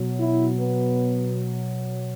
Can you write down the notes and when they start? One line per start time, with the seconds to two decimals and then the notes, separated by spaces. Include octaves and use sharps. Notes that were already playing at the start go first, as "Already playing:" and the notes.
Already playing: B2 F#3
0.20 E4
0.59 B3